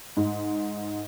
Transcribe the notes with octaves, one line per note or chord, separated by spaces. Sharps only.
G#2